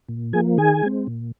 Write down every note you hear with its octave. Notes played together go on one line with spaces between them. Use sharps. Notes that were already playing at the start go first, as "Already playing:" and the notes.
A#2
F3 A#3 G#4 G#5
D#3 G#4 G#5
G#3 C4
A#2